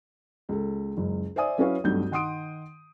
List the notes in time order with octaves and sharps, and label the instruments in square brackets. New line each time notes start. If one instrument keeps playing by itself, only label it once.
[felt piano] C#2 A4
F#1 C#2
C5 D5 E5 G#5 D#6
F#3 C#4 E4 B4 C#5 F5
B1 G2 A3 C4 F#4 G6
D#3 F#5 C6 D#6 D7